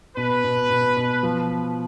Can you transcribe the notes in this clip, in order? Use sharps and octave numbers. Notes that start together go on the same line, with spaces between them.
B2 B4
B2
B2
B2
F3